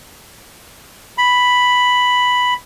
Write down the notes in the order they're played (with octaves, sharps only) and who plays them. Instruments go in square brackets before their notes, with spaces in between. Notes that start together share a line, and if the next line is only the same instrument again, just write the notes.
[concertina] B5